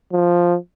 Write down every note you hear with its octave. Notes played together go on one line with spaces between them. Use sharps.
F3